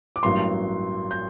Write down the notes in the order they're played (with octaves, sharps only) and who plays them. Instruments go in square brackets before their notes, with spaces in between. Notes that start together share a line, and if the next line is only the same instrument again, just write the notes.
[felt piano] D6
A1 G2 F#3 A#3 C6
G6